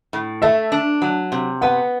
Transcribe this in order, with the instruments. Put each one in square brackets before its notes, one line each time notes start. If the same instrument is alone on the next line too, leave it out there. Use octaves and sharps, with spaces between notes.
[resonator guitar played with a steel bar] A2
[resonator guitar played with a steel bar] A3 [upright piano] E5
[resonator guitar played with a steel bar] D4
F#3
C3
[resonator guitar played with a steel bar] B3 [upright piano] F#5